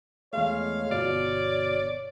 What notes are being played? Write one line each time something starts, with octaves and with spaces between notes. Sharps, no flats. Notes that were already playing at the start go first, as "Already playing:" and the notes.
E2 G#3 A3 C#5 F5
G1 B2 D5 F6